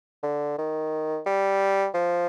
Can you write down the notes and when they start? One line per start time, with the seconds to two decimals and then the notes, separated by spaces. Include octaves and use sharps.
0.23 D3
0.58 D#3
1.26 G3
1.94 F3